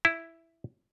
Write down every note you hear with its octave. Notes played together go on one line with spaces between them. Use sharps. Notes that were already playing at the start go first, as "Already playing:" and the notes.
E4